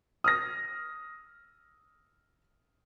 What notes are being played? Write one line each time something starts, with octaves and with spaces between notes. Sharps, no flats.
D#6 F6 A#6